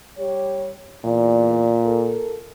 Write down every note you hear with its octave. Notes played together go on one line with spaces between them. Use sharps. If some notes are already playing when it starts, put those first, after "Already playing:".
G3 G4 C#5
E2 A#2 D5
A4 A#4